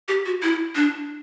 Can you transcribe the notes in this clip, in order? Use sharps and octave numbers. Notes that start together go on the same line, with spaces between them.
G4
F#4
E4
D4